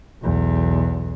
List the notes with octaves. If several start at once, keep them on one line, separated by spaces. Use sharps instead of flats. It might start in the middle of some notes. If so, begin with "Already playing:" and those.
B1 E2